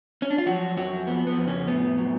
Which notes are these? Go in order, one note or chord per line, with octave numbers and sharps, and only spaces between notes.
C#4
D4
F4
F3 F#3 F#4
F2 F#3 F#4
F3 B3
B3
F2
C#3 C#4
A2 B3
F#3